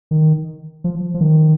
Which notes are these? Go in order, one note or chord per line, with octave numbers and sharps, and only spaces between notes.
D#3
F3
F3
D#3